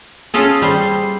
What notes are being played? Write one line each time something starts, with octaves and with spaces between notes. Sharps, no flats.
C#4 F4 G#4 A4
G3 C5